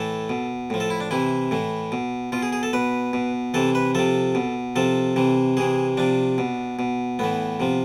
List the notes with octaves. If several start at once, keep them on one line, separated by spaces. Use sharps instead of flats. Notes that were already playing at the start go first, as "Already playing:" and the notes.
Already playing: A2 E3 A4
B2
A2 F3
A4
E4
D4
C3 E3 E4
A2 E3
B2
B2 F4
G#4
G#4
A4
B2 B4
B2
C3 E3 A4
B4
C3 F3 A4
B2
C3 F3 A4
C3 E3
C3 E3 G#4
C3 F3 D4
B2
B2
A2 E3 B3
C3 F3